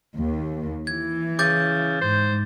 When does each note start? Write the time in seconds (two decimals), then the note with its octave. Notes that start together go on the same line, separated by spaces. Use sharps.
0.16 D#2
0.87 E3 G#6
1.39 C#3 D6 G6 A6
2.01 G#2 C5